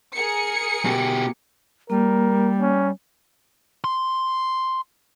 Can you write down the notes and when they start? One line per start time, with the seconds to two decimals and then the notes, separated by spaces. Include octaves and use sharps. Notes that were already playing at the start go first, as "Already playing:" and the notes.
0.14 G#4 A#4 C#7
0.85 B2 G4
1.90 G3 A#3 A#4
2.61 C#4
3.84 C6